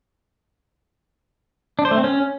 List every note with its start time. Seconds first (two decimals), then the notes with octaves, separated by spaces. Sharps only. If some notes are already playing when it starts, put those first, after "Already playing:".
1.79 D4
1.85 C5
1.91 A3
1.98 C4
2.04 C#4